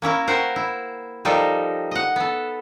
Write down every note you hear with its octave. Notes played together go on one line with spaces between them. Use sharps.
A#3 C#4 E4 A#4
A#4 C5 F#5 G5
E4
F3 G3 D#4 A4 A#4
D#5 F#5
B3 A4